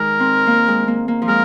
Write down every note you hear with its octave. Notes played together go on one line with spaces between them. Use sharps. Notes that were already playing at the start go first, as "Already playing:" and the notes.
Already playing: D#3 G#3 A#4
C4
A#3
G#3
A#3
A#3
F3
G#3 A#4